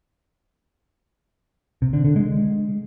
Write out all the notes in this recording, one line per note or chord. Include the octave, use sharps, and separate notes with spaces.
C3
D3
D3
G#3